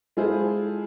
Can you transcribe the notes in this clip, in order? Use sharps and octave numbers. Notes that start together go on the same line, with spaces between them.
G#3 E4 F4 G#4 A4 C5